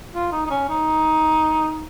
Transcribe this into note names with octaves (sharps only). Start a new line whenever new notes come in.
F4
D#4
D#4
C#4
D#4